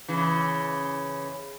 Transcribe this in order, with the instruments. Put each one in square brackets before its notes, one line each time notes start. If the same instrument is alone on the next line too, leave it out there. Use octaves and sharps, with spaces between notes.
[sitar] C#3 E3